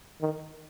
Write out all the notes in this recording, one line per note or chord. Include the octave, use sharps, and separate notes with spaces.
D#3